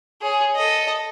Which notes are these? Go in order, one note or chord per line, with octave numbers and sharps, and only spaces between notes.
G#4 C#5
A4 D#5